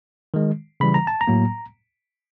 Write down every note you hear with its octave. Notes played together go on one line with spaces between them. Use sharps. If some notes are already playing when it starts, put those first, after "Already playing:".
D#3 G#3
C#3 E3 G3 B5
A#5
A5
A#5
A2 F#3 A#3